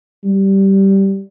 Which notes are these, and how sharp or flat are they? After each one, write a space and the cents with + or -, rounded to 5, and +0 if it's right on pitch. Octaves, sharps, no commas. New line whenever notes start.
G3 -10